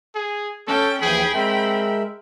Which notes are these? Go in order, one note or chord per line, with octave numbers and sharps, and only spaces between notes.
G#4
C#4 A4 G5
D#2 E3 F3 G#4 G5 B5
G#3 C4 A#4 E5